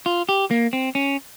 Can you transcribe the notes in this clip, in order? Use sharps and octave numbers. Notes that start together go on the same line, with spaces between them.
F4
G4
A#3
C4
C#4